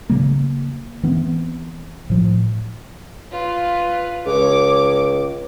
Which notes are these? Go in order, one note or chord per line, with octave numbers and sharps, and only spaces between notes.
C#3 F#3 A#3
E3 B3 C4
A2 F3
F4 B4
C#2 C#5 D6